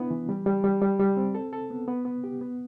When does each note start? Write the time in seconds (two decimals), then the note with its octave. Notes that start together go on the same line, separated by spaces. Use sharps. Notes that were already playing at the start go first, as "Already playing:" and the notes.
Already playing: B3 D4 E4
0.11 E3
0.29 G3
0.46 G3
0.64 G3
0.82 G3
1.00 G3
1.17 C4
1.35 A4
1.53 A4
1.71 B3
1.88 B3
2.05 B3
2.24 G4
2.41 B3